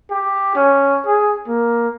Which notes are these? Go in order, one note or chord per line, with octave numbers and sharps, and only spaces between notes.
G4
C#4
G#4
A#3